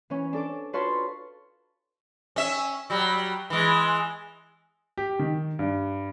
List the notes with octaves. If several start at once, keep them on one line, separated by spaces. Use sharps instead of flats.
E3 C#4
D4 A4 D6
F4 F#4 B4 C#5 A5 C6
C#4 E5
F#3 G3
E3 G#3
G4
D#3
G2